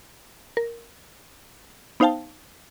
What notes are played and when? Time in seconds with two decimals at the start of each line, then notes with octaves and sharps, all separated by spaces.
0.57 A#4
2.00 B3 D#4 C5 F5 G5 A5